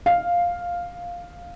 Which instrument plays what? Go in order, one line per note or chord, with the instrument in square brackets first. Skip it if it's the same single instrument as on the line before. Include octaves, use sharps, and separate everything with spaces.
[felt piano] F5